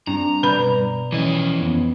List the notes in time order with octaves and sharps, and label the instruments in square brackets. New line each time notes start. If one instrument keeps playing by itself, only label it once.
[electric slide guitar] G2 [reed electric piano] C4 D4 [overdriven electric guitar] A#5
[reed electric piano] B2 D5 [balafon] B4 B5
[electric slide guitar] E3 C#4 [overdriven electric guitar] F3 D#5
[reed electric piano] F2 B3